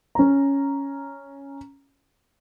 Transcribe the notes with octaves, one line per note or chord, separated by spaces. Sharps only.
C#4 A#5